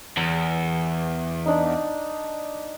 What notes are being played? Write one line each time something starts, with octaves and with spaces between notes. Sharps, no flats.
E2
D4 D#4